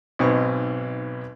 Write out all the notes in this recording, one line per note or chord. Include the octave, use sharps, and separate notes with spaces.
B1 G#2 B2 C4 D#5 C#6